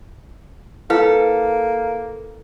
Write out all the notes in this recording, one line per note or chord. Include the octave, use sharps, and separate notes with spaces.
A#3 E4 A4 B4 F5